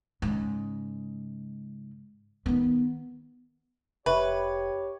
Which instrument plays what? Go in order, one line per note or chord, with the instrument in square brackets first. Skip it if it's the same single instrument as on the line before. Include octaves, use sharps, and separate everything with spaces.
[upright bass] G#2 C#3
D#3 B3
[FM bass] F1 [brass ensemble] G4 C#5 [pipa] B4 [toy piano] E5 F#5 C#6